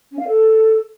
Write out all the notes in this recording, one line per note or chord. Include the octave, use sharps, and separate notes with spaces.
C#4
F5
A4